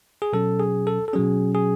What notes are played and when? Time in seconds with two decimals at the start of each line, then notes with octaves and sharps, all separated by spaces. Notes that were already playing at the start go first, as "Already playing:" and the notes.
0.22 G#4
0.33 B2 F#3 C#4 A4
0.60 G#4
0.87 A4
1.08 A4
1.13 B2 F#3 C#4 G#4
1.55 G#4